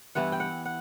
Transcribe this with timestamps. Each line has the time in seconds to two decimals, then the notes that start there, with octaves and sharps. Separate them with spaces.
0.15 G2 E3 B3 E4 F#5
0.32 G5
0.40 F#5
0.65 F#5